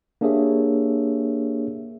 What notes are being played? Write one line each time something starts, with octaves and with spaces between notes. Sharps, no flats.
A#3 D4 G4 G#4 C#5 E5